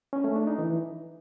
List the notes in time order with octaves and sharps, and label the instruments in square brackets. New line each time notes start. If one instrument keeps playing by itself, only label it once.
[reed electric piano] C#4
A3
D4
D#4
E3